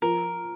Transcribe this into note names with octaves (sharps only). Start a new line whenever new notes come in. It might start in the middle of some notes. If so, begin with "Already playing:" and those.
F3 A#4